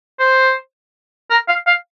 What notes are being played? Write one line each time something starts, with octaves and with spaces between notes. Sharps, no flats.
C5
A#4
F5
F5